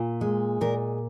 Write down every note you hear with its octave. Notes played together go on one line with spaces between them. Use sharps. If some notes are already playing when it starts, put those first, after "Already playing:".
Already playing: A#2
G#3
A#2 A#4